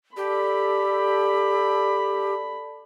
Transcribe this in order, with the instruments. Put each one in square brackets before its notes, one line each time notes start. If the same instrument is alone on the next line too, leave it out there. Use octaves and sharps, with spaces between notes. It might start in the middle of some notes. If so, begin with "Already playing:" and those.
[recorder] G4 [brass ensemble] A4 D5 [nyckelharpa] B5